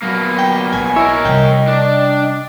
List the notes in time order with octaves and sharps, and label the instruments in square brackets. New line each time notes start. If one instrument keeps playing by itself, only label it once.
[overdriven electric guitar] B2 A#3 [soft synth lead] F#3
[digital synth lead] G5
[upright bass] B1 [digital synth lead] G#5
[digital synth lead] E4 [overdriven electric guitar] A#4 C#5 [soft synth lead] D#5
[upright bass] C3 G3 [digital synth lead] G5
[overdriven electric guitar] D4